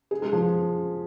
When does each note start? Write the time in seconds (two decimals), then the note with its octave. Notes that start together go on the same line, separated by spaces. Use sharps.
0.11 G#4
0.22 G#3
0.33 F3